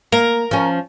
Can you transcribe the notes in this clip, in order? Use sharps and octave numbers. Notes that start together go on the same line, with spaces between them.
A#3 A#4
F3 C#4